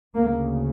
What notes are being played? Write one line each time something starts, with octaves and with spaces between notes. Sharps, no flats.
D2 C#3 A#3